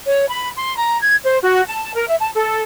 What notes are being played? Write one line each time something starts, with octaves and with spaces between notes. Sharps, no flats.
C#5
B5
C6
A#5
G#6
C5
F#4
A5
A#4
E5
A5
A4